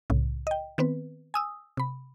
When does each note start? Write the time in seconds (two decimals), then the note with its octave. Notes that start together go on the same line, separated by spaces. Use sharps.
0.10 C2 A2 C#3
0.47 D#5 G5
0.78 D#3 B3 C4 B4
1.34 G#5 D#6 E6
1.77 C3 B5